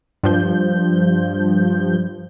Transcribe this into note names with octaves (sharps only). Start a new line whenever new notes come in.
G2 F3 G6